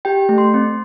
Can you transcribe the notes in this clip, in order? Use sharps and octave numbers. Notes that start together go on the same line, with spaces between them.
G4 G5
A3
C6
C4